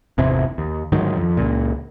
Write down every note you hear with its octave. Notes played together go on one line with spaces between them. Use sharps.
G#1 E2 C3 E3
D#2
D2 G#2 D#3 F#3
F2
C#2 A#2